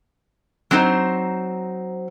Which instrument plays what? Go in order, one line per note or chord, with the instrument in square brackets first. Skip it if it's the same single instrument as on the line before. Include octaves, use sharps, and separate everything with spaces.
[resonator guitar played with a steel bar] F#3 C4 D#4 C5